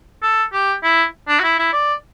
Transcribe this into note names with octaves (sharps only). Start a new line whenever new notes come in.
A4
G4
E4
D4
F#4
E4
E4
D5